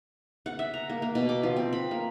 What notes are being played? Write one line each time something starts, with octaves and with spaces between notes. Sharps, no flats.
F#5
E5
A#5
A#3
A#3
B2
D6
F3
C4
B5
A#3